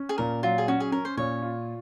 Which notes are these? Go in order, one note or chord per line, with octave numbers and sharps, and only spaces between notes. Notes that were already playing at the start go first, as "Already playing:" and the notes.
Already playing: C#4
G#4
A#2 A#4
F#3 F4
G#4
C#4 F#4
G#4
C#4 A#4
C5
A#2 C#5
F4